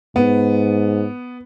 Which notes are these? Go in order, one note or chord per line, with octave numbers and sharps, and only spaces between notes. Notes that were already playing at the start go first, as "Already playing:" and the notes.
G#2 B3